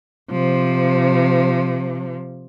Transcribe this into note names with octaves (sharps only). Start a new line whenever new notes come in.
C3 F3